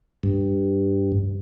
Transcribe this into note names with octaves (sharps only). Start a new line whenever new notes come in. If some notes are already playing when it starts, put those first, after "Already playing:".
G2